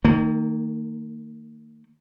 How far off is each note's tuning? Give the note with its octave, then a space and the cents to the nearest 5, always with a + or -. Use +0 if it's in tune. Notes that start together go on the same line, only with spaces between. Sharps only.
D#3 +0 A#3 -45